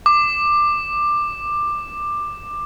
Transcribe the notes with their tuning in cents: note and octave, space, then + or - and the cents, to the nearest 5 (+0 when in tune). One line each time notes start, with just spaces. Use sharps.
D6 +15